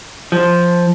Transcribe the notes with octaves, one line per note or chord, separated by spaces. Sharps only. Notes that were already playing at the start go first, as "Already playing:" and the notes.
F3